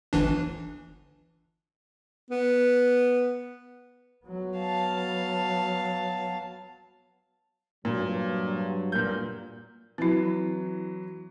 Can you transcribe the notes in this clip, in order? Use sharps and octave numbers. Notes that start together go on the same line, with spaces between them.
G1 E3 D4
B3
F#3 B3
F5 A5
G2 A#2 F#3
A#2 A#4 G6
E3 F#3 C4 E4